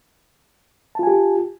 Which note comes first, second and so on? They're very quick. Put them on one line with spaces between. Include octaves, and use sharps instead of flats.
A5 F4 G#5 G4